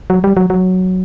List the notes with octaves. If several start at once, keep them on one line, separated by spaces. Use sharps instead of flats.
F#3
G3
F#3
F#3